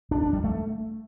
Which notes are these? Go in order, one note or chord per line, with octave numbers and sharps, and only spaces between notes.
D4
D4
G3
A3